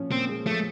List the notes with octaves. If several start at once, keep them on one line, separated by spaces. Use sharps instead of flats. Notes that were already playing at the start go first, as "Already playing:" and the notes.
Already playing: A#2 F3 C#4
A#2 C4
G#3
F3 A3